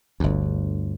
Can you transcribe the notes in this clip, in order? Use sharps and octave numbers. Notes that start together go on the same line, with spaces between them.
G1 D2